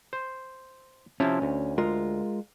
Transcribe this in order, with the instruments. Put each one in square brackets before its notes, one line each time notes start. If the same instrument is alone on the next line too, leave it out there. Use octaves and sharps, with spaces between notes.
[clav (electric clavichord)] C5
[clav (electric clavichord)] C3 F3 E4 [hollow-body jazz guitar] C#4
[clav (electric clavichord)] D2
[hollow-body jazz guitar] G#3 F4 A#4